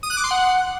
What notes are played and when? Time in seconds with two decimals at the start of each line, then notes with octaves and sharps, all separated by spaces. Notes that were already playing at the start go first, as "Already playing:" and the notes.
0.03 D#6
0.10 F#6
0.17 D6
0.24 C6
0.31 F#5